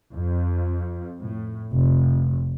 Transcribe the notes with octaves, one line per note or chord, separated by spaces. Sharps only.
F2
A2
F1